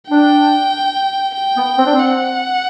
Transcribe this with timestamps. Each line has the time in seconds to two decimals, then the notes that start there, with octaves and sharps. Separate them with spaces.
0.10 D4 G5
1.35 G5
1.57 B3
1.78 C4
1.85 D4
1.94 C4
1.99 F#5